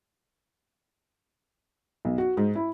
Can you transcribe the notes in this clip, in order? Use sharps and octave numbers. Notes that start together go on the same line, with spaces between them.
B1
F#4
G#2
E4